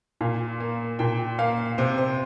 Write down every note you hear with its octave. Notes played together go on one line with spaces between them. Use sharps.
A#2 F5
A#3
A#2 G5
A#3 F5
C3 C5
C5